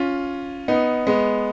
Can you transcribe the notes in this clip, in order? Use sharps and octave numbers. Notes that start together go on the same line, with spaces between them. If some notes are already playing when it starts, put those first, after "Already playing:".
Already playing: C#4 F4
B3 D#4
G#3 B3